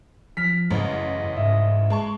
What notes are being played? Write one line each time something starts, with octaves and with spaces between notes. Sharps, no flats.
F3 F6 B6
A1 F#2 C#3 D#5
G#2 E5
G#3 A5 C#6